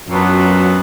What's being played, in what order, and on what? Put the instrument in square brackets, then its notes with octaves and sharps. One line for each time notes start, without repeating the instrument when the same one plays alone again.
[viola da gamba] F#2 [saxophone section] A#2 F#3 B3 D4